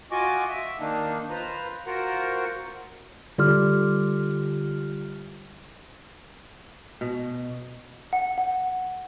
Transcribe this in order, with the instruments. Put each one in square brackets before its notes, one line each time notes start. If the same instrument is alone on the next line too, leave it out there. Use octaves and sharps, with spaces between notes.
[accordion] F4 F#4 D#5 G#5 C#6 D6
E5
D#3 A#3 D4 D#4
F4 B4 C5 A#5
F4 F#4 A#4 C5 F#5
[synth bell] D3 G3 F4 G4 F6
[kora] B2
[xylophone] F#5
F#5